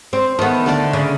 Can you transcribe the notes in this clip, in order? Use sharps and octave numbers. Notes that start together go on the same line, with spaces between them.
C4
D#3 A3 B3
D3 A3 D5
C#3